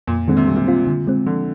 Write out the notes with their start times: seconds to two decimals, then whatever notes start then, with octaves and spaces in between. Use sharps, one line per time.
0.07 F2 A#2
0.28 D3 D#3 G#3 C4
0.37 C3
0.47 A#2 G3
0.56 C3
0.67 C4 F4
0.87 D3
1.07 G#3 C4
1.26 D3 F3